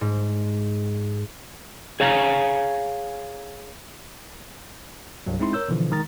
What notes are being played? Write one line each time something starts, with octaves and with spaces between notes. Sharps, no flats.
G#2
G#4 C#5 F5 G#5 A#5
C2 G2 F#3
G#3 C4 D#4 E4 C6
A#4 C#5 E6 G6
B2 D3 E3 F3
D#3 G#3 A#5 A6